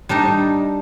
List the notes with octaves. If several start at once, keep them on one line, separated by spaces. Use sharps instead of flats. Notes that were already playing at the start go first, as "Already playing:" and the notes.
G3 D4 D#4